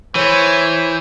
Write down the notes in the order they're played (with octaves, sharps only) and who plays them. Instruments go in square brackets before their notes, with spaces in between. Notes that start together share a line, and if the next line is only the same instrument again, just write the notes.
[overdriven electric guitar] E3 [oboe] C5 [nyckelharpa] C#5